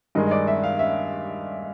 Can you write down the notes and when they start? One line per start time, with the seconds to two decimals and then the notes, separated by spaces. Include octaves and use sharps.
0.15 G2 D#3 G#3 D#5
0.26 D#5
0.31 D5
0.47 E5
0.63 F5
0.79 E5